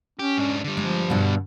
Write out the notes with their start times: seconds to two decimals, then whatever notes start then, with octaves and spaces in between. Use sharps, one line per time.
0.19 C#4 G4
0.38 G#2 D4
0.64 D3 G3
0.77 F3 G#3
1.10 G2 B2